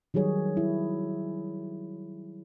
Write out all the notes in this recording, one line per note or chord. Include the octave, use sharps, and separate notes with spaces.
D#3 F#3 G3 G#4 C#5
E4